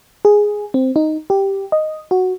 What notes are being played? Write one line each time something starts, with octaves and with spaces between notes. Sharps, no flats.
G#4
C4
D#4
G4
D#5
F#4